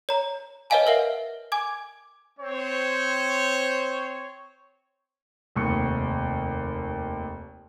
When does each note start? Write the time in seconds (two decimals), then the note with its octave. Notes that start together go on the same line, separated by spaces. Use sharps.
0.09 C#5 A#5
0.70 B4 C#5 D#5 F5 G#5 A5
0.86 A#4 B4 E5 F#5
1.52 G#5 D6 G#6
2.40 C4 C5 C#5
5.56 F1 D#2 C#6 D#6 C#7